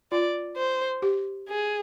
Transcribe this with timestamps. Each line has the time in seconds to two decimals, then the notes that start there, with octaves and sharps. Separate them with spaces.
0.12 F4 D5
0.57 C5
1.02 G4
1.49 G#4